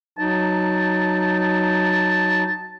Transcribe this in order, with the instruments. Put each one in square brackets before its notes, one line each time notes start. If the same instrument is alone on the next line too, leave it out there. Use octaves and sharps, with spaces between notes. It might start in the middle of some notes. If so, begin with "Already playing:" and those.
[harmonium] F#3 D#4 [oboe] A5